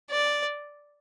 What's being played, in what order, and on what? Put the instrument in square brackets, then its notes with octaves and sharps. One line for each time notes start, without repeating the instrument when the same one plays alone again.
[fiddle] D5